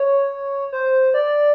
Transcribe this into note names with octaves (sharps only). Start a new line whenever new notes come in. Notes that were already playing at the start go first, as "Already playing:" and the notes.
Already playing: C#5
C5
D5